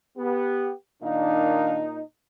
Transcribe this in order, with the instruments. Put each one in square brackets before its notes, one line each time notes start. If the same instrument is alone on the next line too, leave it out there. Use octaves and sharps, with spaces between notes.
[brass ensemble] B3 G4
[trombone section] A#2 D#4 [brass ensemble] D#3 D4 F5